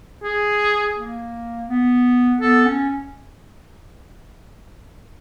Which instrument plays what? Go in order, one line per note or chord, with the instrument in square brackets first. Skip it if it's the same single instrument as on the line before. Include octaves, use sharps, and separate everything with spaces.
[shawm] G#4
[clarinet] A#3
B3
[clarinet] B3 [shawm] A4
[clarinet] C#4